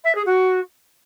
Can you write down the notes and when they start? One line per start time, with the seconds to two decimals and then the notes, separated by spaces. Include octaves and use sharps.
0.04 E5
0.15 G#4
0.26 F#4